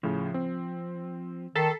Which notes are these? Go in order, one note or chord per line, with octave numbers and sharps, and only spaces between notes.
A2 C#3 F3
C4
D#3 A4 A#5 B6 C7